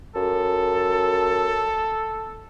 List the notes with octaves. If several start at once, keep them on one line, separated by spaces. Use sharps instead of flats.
F#2 A4